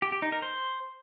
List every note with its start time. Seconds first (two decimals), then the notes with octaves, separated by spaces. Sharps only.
0.02 G4
0.12 G4
0.22 D#4
0.32 A#4
0.42 C5